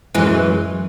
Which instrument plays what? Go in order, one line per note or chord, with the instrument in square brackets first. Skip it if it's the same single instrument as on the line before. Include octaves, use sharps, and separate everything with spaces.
[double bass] F#2 [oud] E3 G#3